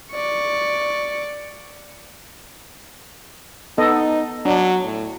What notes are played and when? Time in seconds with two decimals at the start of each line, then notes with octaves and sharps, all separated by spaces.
0.12 D5 C#6
3.78 B3 D#4 A4 D#5
4.45 F#3 D4
4.84 A2